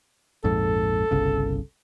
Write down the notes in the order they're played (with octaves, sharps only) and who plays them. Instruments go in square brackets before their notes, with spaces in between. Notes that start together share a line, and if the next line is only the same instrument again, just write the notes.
[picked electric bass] A#1 F2 G#2 [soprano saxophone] A4
[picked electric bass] G1 C2 C#3